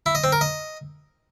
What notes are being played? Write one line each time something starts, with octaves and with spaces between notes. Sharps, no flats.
E4
D#5
C4
A#4
D#5